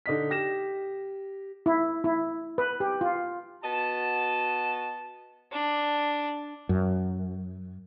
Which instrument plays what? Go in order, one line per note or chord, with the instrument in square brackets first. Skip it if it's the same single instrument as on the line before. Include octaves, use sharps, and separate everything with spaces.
[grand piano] D3 D#4 B6
G4 A#6 E7
[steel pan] E4
E4
B4
G4
F4
[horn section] B3 F#4 D#5 A5
[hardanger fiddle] D4
[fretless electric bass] F#2